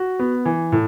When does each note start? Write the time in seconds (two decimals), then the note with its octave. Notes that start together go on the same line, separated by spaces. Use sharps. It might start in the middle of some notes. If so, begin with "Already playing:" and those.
Already playing: F#4
0.19 B3
0.45 E3
0.72 A2